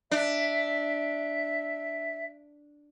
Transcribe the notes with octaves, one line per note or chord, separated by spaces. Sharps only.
D4 E5